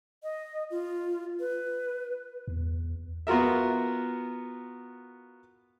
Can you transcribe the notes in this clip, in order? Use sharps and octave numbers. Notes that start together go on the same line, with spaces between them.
D#5
F4
B4
E2
B3 F4 F#4 A#4 E5